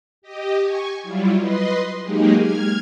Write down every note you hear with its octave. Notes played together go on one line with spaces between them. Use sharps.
G4 D#5
G#5 C#6
F#3 G3 E4 F4
B4 D#5 C6
F#3 G#3 A#3 D#4 G4 G#4
F6 G#6